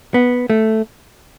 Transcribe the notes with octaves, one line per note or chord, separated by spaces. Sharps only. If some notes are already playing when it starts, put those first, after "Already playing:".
B3
A3